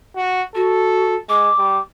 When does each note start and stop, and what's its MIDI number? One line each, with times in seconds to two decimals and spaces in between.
0.16 0.42 66
0.55 1.15 66
0.55 1.17 69
1.29 1.50 56
1.29 1.78 86
1.58 1.79 55